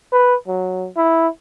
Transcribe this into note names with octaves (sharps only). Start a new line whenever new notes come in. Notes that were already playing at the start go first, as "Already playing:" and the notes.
B4
F#3
E4